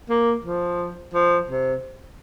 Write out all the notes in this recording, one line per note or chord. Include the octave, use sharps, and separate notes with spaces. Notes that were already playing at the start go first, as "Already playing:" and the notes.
A#3
F3
F3
C3